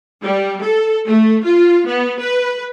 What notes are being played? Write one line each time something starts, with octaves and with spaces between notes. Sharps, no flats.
G3
A4
A3
F4
B3
B4